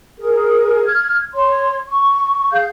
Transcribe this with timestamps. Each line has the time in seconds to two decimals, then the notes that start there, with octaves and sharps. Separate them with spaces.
0.20 G#4 A#4
0.85 F6 G#6
1.35 C#5 C6
1.88 C#6
2.52 G#4 F5 G6